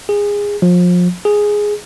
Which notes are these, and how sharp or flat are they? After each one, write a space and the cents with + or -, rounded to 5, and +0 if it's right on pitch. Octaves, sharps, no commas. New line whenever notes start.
G#4 -20
F3 +30
G#4 +0